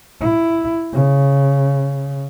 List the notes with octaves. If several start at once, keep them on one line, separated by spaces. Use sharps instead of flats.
E4
C#3